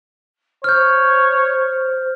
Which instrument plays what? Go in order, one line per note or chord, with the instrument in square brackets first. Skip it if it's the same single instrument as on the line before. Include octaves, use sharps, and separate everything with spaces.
[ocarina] C5 [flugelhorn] C#5 [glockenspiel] F6 G6